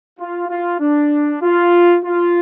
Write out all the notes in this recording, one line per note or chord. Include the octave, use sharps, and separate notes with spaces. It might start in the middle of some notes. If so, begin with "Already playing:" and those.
F4
F4
D4
F4
F4